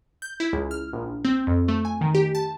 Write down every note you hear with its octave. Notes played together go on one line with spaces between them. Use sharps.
G6
E4
C#2
F6
A#1
C4
F2
A3
G#5
D#3
G4
A5